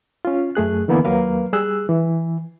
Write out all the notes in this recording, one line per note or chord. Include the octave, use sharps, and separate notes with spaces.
C#4 F4
F#2 A3 G#4 F#6
D3 E3 A#3 B3 E4
D#2 F#3 A#3 A#4 B4 F5
G3 G#4 E6 F#6
E3